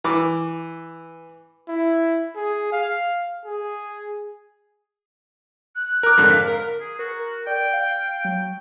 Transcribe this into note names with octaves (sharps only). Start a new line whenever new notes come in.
E3 D6
E4
G#4
F5
G#4
F#6
A#4 D6
F2 G#2 D3
F5 B6
A#4
G#4
F#4 A#4
D5 G5
F5
F#3